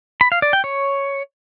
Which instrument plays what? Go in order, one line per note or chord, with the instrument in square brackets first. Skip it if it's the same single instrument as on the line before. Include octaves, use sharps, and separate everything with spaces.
[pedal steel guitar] B5
F5
D5
G5
C#5